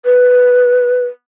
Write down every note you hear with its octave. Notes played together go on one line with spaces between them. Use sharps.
B4